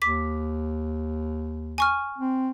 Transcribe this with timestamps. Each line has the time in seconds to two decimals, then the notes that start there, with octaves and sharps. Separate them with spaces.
0.02 D#2 D6 B6
1.78 G#5 C#6 F6
2.18 C4